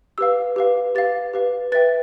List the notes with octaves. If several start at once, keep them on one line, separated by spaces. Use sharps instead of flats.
G4 B4 F5 E6
G4 B4 F5
G4 B4 F5 A6
G4 B4 F5
B4 E5 G5 A6